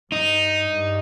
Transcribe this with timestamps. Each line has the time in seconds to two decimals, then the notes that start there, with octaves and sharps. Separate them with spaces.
0.12 G2 D#4
0.67 G2